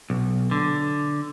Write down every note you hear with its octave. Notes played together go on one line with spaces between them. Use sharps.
B1
D3